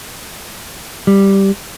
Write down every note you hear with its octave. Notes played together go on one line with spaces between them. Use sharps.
G3